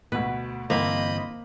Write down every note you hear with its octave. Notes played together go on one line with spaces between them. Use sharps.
D2 B2 B4
G2 D3 E3 A#3 C4 C5 D#5 B5